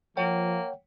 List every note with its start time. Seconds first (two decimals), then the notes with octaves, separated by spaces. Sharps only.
0.17 F3 A#3 C#5 F#5 G5